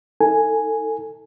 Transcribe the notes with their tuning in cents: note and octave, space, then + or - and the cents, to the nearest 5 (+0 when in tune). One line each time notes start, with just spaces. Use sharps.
D#4 +35 A4 +25 G#5 +0